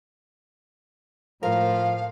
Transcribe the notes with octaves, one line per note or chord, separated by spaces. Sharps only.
A2 F3 A#4 F5